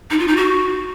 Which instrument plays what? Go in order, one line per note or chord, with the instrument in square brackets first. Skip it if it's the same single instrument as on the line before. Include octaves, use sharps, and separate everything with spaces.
[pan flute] D#4
F4
D#4
F#4